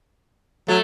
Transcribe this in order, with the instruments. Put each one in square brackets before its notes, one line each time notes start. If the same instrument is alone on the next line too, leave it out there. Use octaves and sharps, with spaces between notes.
[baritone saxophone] F#3 [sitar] A3